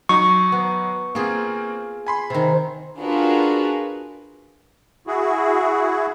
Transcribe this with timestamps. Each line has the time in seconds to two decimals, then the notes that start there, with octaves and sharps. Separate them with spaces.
0.09 F#3 D#4 C#6
0.52 B3
1.15 A#3 C4 F4 G#4
2.07 G#5 B5 C6
2.30 C3 D#3
2.98 D4 F4 F#4 G#4 A#4 B4
5.07 E4 F#4 G#4